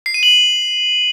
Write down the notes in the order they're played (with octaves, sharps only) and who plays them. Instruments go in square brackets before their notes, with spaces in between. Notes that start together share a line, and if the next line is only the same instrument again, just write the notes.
[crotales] C7
D#7
F#7